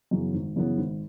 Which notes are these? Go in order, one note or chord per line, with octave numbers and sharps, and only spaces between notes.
F#2 C#3 E3 B3
G#1
F#2 C#3 E3 B3
G#1